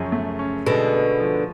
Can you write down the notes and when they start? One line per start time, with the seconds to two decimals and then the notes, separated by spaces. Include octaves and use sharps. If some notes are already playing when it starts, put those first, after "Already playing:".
Already playing: F#2 C#3 F3 C#4
0.12 A3
0.39 C#4
0.66 B2 D3 G#3
0.93 B3
1.20 F3